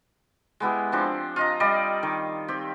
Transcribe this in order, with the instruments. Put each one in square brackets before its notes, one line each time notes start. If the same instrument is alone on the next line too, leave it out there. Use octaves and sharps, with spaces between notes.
[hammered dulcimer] G#3 B3 E4 G4
F3 C4 D4
F4 D#5 A#5
G3 D5 D#5
D#3
C4 G4